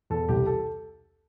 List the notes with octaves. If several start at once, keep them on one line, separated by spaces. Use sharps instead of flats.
E2 A4
C2 G4
A4